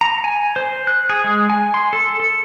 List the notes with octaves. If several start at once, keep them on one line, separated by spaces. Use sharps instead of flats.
A#5
G#5
C5
F#6
G#4
G#3
G#5
C6
A4
A4